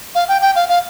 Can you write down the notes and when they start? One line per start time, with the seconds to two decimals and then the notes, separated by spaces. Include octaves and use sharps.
0.15 F5
0.28 G5
0.42 G5
0.56 F5
0.69 F5